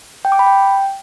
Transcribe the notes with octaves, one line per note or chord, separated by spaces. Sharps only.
G5
D6
B5
G5